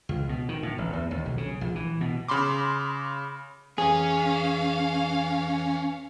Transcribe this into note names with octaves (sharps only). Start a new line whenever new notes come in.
C#2
B2
D#3
A2
A1
E2
D#2
B1
C#3
A#1
E3
B2
C#3 B5 C6 D6
F2 E3 C#4 G#4 F5